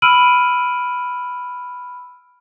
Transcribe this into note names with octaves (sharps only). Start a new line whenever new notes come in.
B5 E6 F6 D7 D#7 F#7